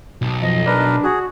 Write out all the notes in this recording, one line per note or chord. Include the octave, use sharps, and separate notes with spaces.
B1
F2 D#5
D4 A#4 B4
F#4 G#4